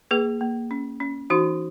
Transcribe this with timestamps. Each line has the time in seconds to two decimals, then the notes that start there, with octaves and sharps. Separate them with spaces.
0.11 A#3 G#4 B4
0.41 A#3
0.71 C#4
1.00 C#4
1.30 E3 D#4 F#4